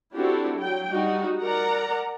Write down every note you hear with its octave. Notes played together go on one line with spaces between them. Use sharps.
C4 D4 E4 F#4 G4 A4
F#3 G5
G3 D#4 F#4
A#4 D5 F#5 A#5